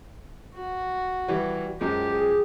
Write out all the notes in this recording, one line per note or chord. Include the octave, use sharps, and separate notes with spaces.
F#4
E3 G3
F#2 F3 G#3 G4
G#4